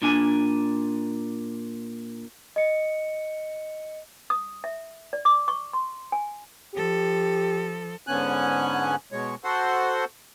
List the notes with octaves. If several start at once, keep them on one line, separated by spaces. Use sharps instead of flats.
A#2 D4 G#5
D#5 C#7
D#6
E5
D5
D6
C#6
C6
G#5
F3 G4 A4
G#2 D3 B3 C#4 G#5 F#6
B2 G#3 C#5
F#4 A4 C5 F#5 C6